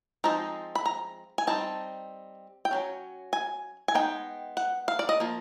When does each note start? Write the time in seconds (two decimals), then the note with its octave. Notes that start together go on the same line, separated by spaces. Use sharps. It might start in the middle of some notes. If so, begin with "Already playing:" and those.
0.24 F3 G#3 C4 D#4 A#5
0.75 B5
0.86 A#5
1.38 G#5
1.47 G3 C4 D#4 A5
2.65 G5
2.71 F#3 A3 C#4
3.33 G#5
3.88 G#5
3.95 G#3 B3 D#4 G5
4.57 F#5
4.88 F5
4.99 D5
5.09 D#5
5.20 F3 A#3